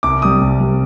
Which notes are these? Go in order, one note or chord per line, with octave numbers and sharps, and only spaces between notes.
C2 D6
C3 G3 D#6
C2
C3 G3